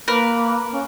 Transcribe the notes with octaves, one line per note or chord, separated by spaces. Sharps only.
A#3 A#4 B4
C#4